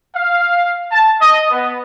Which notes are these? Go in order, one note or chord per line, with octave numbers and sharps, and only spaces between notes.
F5
A5
D#5
B3